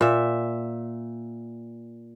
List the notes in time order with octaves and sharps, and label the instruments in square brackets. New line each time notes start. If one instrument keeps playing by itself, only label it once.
[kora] A#2 E5